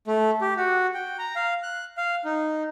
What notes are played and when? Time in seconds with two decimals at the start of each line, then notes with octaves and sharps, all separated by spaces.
0.08 A3
0.41 G4
0.57 F#4
0.94 G5
1.19 A#5
1.36 F5
1.63 F#6
1.97 F5
2.25 D#4